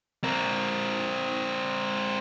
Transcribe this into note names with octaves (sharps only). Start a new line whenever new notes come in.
C4 A#4